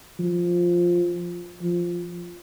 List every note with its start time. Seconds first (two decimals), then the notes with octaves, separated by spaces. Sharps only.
0.19 F3
1.62 F3